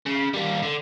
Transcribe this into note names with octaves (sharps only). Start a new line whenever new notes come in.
C#3
G3 A#3
D3